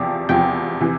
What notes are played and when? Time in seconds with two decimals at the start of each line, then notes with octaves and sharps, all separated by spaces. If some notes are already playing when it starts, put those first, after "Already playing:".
Already playing: E2 C3 F3 G5
0.29 E2 C3 F3 G5
0.80 C3 E3